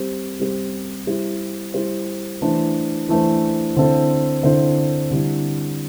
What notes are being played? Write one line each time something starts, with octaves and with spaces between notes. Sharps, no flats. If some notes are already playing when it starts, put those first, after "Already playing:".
Already playing: G3 C4 G4 C5
G3 C4 G4 C5
G3 E4 G4 C5
G3 E4 G4 C5
E3 A3 D4 C5
E3 A3 D4 C5
D3 C4 E4 A4 C5
D3 C4 E4 A4 C5
D3 G3 C4 E4